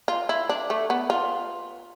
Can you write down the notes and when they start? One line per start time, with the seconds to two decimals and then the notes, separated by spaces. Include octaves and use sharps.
0.08 F4
0.29 E4
0.49 D4
0.70 A3
0.90 B3
1.10 F4